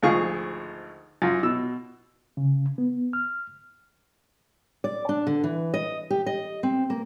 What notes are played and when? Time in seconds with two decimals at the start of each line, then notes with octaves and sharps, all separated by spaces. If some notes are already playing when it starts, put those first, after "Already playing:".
0.02 G#1 D2 F3 G#4 F5 C#6
1.22 F#2 F4
1.43 B2 E6
2.37 C#3
2.78 B3
3.13 F6
4.84 D5
5.09 D4
5.27 D3
5.44 E3
5.74 D#5
6.10 G4
6.26 D#5
6.63 C4
6.90 A#3